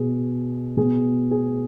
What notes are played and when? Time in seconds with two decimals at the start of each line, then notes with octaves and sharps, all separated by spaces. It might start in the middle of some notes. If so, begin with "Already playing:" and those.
Already playing: B2 G#4
0.77 B2 G#4
1.31 G#4